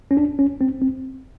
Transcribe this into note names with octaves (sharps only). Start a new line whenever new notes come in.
C#4
D4
C#4
C4
C4